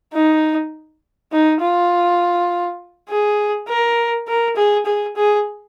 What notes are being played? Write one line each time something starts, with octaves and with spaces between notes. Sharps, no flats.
D#4
D#4
F4
G#4
A#4
A#4
G#4
G#4
G#4